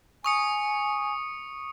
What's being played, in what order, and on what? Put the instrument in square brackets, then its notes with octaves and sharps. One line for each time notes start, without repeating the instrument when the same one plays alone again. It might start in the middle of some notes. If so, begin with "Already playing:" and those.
[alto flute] G#5 [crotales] C#6 D#6 C#7